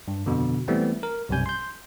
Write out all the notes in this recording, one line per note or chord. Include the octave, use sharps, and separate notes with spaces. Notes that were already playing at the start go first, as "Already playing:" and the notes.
G2
F2 B2 D3
E3 G3 A3 B3 C4
A#4
B1 F#2 C3 G3 G#5 G6
C6 G6